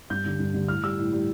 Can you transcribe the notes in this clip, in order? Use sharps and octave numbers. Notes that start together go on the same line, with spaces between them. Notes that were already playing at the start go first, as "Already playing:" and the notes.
G2 G6
D3 G3
G2
D3 G3
A2 F6
G3 E6
A2
G3